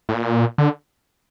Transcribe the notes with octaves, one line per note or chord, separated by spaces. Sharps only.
A2
A#2
D3